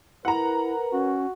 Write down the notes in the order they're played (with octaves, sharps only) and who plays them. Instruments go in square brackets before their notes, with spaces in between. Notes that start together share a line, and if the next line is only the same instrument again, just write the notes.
[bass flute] E4 [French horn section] A#4 B4 [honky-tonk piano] F#5 A#5
[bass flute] C#4 [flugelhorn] F#4